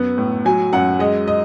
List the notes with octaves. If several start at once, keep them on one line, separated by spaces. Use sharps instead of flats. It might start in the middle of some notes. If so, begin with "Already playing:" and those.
Already playing: F#2 B3
A2
F#3 G#5
F#2 F#5
G#3 D#5
D#5